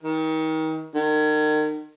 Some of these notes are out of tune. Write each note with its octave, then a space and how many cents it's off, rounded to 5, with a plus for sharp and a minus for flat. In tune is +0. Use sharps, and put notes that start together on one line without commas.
D#3 +30
D#3 -35